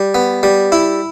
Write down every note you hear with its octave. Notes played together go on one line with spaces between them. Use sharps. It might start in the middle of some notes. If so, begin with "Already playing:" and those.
Already playing: G3
B3
G3
E4